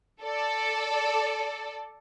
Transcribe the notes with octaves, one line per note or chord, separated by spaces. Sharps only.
A4 D5